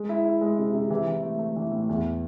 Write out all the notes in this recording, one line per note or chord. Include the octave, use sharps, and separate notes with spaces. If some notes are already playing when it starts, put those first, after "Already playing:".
Already playing: G#3
E4
E4
G#3
C3
C3
E3
E3
A3
A3
E3
A2
E2